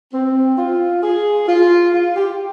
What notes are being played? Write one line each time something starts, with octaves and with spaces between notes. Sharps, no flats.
C4
F4
G#4
F4
F4
G4